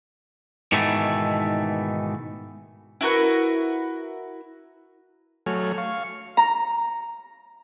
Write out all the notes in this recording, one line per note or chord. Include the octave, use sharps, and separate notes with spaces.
G#2 B2 D#3 E3 A3
E4 F#4 A#4 B4
F#3 A3 C#5 G#5 F6
F5 C#6
A#5